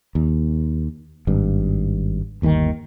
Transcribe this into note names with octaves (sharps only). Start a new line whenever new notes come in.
D#2
G#1 G2
G1 D#2 D3 D#3